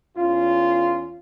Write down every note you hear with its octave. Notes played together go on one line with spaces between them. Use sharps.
E2 C#4 F4